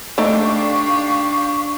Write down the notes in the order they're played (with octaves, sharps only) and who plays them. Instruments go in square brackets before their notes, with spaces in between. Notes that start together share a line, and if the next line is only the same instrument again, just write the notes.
[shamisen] A3 D#4 D5 [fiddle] D4 G4 [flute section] F5 C#6